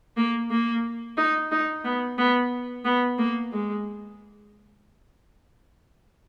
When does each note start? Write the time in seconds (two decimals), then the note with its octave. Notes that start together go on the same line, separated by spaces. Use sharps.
0.17 A#3
0.51 A#3
1.17 D#4
1.52 D#4
1.84 B3
2.18 B3
2.85 B3
3.18 A#3
3.53 G#3